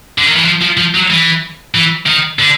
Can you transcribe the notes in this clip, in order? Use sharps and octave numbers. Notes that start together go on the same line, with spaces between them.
D3
D#3
E3
F3
F3
F3
F#3
E3
E3
D#3
D3